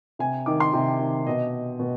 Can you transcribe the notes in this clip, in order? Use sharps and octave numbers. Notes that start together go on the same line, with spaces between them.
C3 G#5
D#3 D6
C6
C3
D#3
B2 D#5
B2